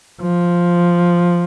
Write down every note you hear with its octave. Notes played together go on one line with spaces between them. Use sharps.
F3